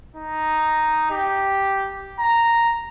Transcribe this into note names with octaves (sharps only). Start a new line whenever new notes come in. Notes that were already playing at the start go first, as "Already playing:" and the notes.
D#4
G4
A#5